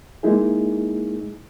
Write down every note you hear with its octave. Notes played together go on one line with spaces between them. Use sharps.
G#3 A#3 D#4 E4 G#4